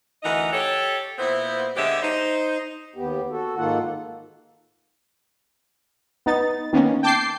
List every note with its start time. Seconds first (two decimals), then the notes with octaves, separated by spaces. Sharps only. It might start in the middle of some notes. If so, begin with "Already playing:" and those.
0.23 D2 E3 D#4 A#4 D#5 F#5
0.53 G4 A4 C#5
1.18 A#2 B3 C4 E4 C5
1.76 D3 G#3 B3 G4 C#5 E5
2.02 D#4 C5
2.96 D#2 B3 G4
3.30 F#4 A4
3.57 G#2 D#3 A#3 F4 A4 F#5
6.26 B3 D#4 A6
6.73 D#3 A#3 B3 C#4
7.03 G5 A5 D6 G6 C7